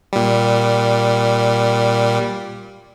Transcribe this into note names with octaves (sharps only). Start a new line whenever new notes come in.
A#2 G3